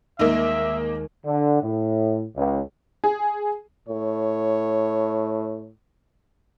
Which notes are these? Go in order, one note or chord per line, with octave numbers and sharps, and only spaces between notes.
D#2 G#3 A#3 D#4 A#4 E5
D3
A2
C#2
G#4
A2 C#5